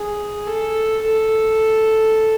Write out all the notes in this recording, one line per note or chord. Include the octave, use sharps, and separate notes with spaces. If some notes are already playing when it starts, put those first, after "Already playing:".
Already playing: G#4
A4
A4